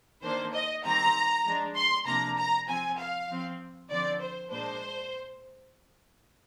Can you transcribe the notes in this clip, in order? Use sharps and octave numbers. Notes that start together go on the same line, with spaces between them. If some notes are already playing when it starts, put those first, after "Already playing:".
D#3 A#3 D4 C5
D#5
D#3 G3 C4 A#5
F3 G#3 D4
C6
C3 F3 A#3 D4 A#5
A#5
F3 C4 G#5
F5
F3 C4
D3 F3 C4 D5
C5
A#2 G#3 D4 C5